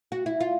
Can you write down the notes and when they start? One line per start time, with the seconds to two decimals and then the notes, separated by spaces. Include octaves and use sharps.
0.12 F#4
0.26 E4
0.40 F4